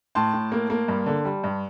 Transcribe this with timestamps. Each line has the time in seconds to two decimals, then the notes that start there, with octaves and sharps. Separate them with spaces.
0.15 A2 A5 C6
0.33 A2
0.52 A#3
0.70 A#3
0.88 G2
1.06 D3
1.25 G3
1.44 G2